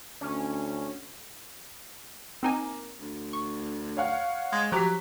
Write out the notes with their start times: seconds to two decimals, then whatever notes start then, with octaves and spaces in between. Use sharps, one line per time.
0.21 D2 C#4
2.43 A#3 C4 D#4 G#5
3.00 D2
3.33 C#6
3.97 C#5 F5 F#5
4.52 G#3
4.72 F3 F#3 G4 A#5 F#6 B6